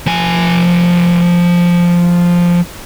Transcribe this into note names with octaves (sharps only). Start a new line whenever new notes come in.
F3 G#5